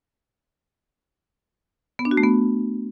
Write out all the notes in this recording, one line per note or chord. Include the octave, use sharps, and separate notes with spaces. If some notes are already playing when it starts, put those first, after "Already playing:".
B3
D4
F#4
A3
B3